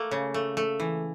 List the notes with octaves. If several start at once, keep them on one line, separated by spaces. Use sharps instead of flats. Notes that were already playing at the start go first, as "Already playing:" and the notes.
Already playing: A3 A#3
C#3
A3
A3
E3